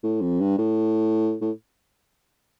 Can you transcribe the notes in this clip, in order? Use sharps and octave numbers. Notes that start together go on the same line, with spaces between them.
A2
F2
G2
A2
A2